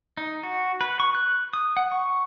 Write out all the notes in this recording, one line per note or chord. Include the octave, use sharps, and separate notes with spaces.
D#4
F#4
B4
C#6
F#6
D#6
F#5
C#6